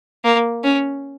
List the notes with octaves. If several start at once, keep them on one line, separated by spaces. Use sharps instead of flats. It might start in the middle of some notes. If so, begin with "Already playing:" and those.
A#3
C#4